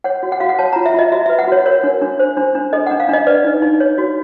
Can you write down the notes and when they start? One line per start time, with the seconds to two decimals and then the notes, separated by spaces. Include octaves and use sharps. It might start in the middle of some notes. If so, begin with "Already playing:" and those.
0.04 C#5 F#5
0.23 F#4
0.32 F#5
0.40 F#4 F5
0.49 F#5
0.59 C#5 A5
0.72 F4 A#5
0.86 E5
0.94 F4 D#5
1.12 F#4 E5
1.26 B4 E5
1.39 F#5
1.48 F#4 C#5
1.66 A#4 C#5
1.84 D4
2.02 D4
2.19 C5
2.37 D4
2.55 D4
2.73 A4 D#5
2.87 F#5
2.91 D4
3.00 F5
3.09 D4 D#5
3.27 B4 D5
3.44 D#4
3.62 D#4
3.80 C#5
3.98 F#4